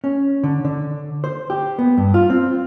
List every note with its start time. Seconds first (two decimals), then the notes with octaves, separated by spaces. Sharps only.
0.04 C#4
0.43 D3
0.65 D3
1.24 C5
1.50 G4
1.79 B3
1.97 G2
2.14 F4
2.30 C4